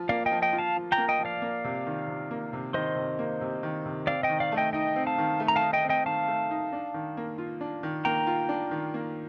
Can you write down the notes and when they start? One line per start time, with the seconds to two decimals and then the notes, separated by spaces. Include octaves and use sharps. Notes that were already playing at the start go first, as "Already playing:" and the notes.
Already playing: F3 F4
0.09 A#3 D5 F5
0.26 D#5 G5
0.32 F3
0.42 D#5 G5
0.53 F4
0.59 F5 A5
0.76 F3
0.92 G5 A#5
0.98 A#3
1.08 D#5 G5
1.19 F3
1.25 D5 F5
1.42 A#3
1.64 C3
1.86 D#3
2.08 C3
2.31 A#3
2.53 C3
2.74 D#3 C5 D#5
2.96 C3
3.19 A#3
3.41 C3
3.63 D#3
3.86 C3
4.07 C4 D5 F5
4.23 D#5 G5
4.29 D#3
4.40 D5 F5
4.52 A3
4.57 D#5 G5
4.73 D#4 D#5 G5
4.96 C4
5.07 F5 A5
5.18 D#3
5.40 A3
5.48 A#5
5.56 F5 A5
5.62 D#4
5.73 D#5 G5
5.84 C4
5.89 D#5 G5
6.06 D#3 F5 A5
6.28 A3
6.51 D#4
6.73 D4
6.94 D#3
7.17 A#3
7.38 F4
7.61 D4
7.83 D#3
8.05 A#3 G5 A#5
8.27 F4
8.49 D4
8.71 D#3
8.94 A#3